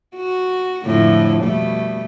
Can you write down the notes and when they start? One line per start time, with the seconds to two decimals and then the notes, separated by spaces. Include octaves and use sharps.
0.16 F#4
0.85 F2 A2 D3
1.42 B2 G3 A3